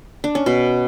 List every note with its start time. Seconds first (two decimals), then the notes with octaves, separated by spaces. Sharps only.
0.24 D4
0.35 C#4
0.46 B2